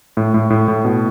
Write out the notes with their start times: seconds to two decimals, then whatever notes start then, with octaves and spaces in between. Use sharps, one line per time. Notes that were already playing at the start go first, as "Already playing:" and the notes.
0.17 A2
0.34 A2
0.50 A2
0.68 A2
0.85 B2